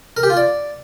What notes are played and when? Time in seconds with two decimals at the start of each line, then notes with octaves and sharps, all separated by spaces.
0.17 A#4
0.23 G4
0.30 F4
0.37 D5